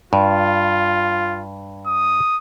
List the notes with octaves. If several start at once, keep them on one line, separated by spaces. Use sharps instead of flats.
G2 F4
D#6